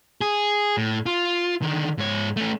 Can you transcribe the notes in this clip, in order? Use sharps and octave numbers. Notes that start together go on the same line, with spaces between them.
G#4
A2
F4
D3 D#3
G#2 C#5
A3 C#4